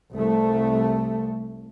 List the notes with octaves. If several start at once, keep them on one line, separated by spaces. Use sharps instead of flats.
C2 A3